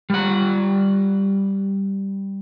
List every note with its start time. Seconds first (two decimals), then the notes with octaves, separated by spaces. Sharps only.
0.10 G3 F#5